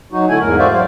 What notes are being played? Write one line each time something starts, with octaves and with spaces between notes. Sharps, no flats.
F#3 D#4 F#4
D3 A3 E4 G#5
E2 G#2 A#4
F#4 C5 D5 E5 F5
F#3 C5 F5